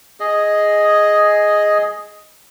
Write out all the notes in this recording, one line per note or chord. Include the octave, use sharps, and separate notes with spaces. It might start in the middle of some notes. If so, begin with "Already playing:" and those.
G#4 D#5